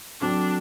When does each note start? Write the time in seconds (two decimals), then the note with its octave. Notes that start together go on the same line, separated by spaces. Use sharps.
0.21 D3 F#3 C4 D4